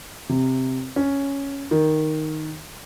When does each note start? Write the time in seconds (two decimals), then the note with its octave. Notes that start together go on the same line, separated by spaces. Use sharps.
0.29 C3
0.96 C#4
1.71 D#3